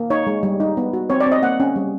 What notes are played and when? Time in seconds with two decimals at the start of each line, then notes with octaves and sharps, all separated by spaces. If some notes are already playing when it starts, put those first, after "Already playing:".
Already playing: A#3
0.10 D#4 C#5
0.27 G#3
0.43 G3
0.60 D#4
0.77 B3
0.93 F#4
1.10 C4 C#5
1.20 D5
1.26 C4
1.32 D#5
1.42 A#3 F#5
1.60 C#4
1.76 G3